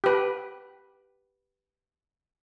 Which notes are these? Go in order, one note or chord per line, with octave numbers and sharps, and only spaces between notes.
G4 B4